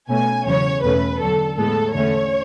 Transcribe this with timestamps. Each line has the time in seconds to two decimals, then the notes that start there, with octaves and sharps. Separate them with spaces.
0.08 B2 A3 C#4 G#5
0.45 E2 C#3 F#3 C#4 C#5
0.82 E2 B2 A3 C#4 B4
1.19 E2 D3 F#3 A4
1.57 A2 G#3 B3 A4
1.93 E2 D3 A3 C#4 C#5